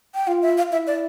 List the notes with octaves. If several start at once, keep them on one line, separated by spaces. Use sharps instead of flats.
G5
F4 F5
E5
F5
E4 E5
D5